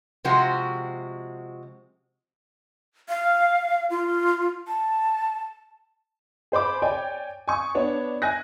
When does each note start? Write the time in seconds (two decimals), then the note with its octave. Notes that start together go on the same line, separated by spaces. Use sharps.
0.24 C3 F3 G#3 C4 F#4
3.09 F5
3.90 F4
4.68 A5
6.52 G#4 C5 B5 D6
6.82 C#5 D5 G5 G#5
7.48 G#5 C#6 D#6
7.75 B3 D4 C#5
8.22 G#5 F#6 A#6